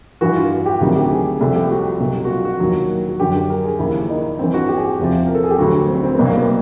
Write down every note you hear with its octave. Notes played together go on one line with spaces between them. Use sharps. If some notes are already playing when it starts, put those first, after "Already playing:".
G2 E3 F#4
F4
F#4
G4
D2 C3 D#3 F#3 G#4
G4
G#4
C2 C3 F3 A4
G4
F#4
C2 B2 F#3
F#4
F4
F#4
D#2 D#3 F#3
F#4
F#2 D3 F#3 G4
A#4
G#4
D#2 C#3 F3 E4
D#4
G2 E3 C4
F#4
G4
G#4
G4
E2 C3 F3
A#4
A4
G#4
G4
D2 D3 F#3 F#4
C4
C4
C2 B2 F#3 B3
A#3
B3